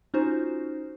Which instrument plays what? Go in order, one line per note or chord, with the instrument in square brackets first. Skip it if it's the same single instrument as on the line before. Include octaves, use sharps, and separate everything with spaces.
[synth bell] C#4 D#4 F4 F#4 C5